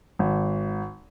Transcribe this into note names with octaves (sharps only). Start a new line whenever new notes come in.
G#1